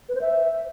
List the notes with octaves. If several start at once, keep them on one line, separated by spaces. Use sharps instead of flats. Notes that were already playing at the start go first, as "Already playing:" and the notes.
B4
C5
E5